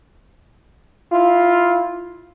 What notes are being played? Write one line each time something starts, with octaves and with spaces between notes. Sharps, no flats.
E4 F4